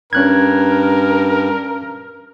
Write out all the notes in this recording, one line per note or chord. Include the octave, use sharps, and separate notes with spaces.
G2 C#4 A#4 F#6 G#6